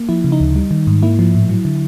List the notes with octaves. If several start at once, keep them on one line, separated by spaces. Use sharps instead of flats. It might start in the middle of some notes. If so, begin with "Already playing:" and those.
Already playing: A#3
F3 E4
C#3
D#4
D2
G3
D#3
G#2
A#3 E4
F3
A2
F#3
D3